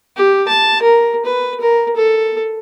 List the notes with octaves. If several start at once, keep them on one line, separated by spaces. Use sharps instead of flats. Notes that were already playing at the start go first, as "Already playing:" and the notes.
G4
A5
A#4
B4
A#4
A4